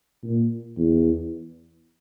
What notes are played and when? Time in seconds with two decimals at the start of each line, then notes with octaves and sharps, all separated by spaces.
0.23 A#2
0.77 E2